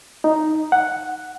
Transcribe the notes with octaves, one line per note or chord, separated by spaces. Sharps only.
D#4
F#5